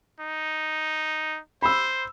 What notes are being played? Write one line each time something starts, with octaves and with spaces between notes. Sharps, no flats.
D#4
C5 B5 E6